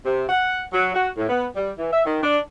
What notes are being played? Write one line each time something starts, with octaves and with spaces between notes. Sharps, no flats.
C3
F#5
F#3
F#4
A2
B3
G3
E3
E5
D#3
D4